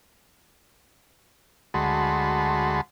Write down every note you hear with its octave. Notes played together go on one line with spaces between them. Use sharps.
D2 G#3 F#4 A5 B5 C6